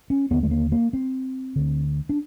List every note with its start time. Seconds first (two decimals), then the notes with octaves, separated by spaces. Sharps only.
0.10 C#4
0.30 D#2 D3 B3
0.43 A3
0.51 A#3
0.72 A#3
0.93 C4
1.56 D2 D3
2.09 D4